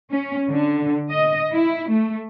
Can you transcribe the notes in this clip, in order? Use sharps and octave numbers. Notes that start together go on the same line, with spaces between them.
C#4
D3
D#5
E4
A3